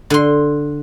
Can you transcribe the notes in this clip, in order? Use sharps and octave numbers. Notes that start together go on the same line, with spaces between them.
D3 C6